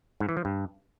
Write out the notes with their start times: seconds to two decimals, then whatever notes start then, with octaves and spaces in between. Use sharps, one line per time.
0.20 G#2
0.29 E3
0.37 F3
0.45 G2